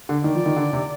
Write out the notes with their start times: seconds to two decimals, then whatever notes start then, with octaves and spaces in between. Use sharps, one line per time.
0.09 D3
0.24 D#3 D5
0.35 F3
0.46 D#3
0.56 D3
0.73 C3